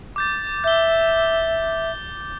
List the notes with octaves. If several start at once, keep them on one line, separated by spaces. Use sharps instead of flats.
D6 G6 A6
E5 G6 G7